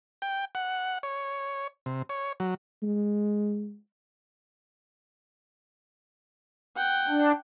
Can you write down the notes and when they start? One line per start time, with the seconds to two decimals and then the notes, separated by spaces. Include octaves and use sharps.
0.22 G5
0.55 F#5
1.03 C#5
1.86 C3
2.09 C#5
2.40 F#3
2.83 G#3
6.76 F#5 G5
7.09 D4